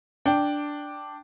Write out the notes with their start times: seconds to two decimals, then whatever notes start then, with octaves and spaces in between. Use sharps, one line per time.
0.26 D4 G5